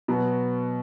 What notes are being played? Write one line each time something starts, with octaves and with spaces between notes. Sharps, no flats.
B2 F#3 B3 F#4